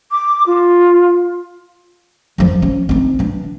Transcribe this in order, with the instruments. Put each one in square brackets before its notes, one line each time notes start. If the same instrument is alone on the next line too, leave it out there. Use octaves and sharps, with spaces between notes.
[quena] D6
F4
[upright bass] F2 F3
C#4
C4 D#4
E3 D4